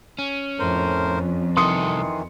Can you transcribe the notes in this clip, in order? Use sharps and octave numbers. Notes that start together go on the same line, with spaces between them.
C#4
F2 A2 A#4 C5
C2 D#3 E3 A4 C6 D#6 C#7